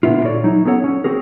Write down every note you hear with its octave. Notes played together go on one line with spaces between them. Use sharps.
A#2 D3 B3 E4 F4
F#4 A4 C#5 D5
F#3 D#4 E4
B3 C#4 F#4 A4 C#5 F#5
C#4
C4 F#4 G#4 A#4